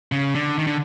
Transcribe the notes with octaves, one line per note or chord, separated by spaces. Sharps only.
C#3
D3
D#3
D3